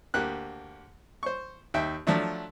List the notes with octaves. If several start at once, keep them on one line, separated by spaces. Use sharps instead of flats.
D2 A#3 G4 F#6
C5 C#6
D#2 E5 G5
F3 F#3 A3 D4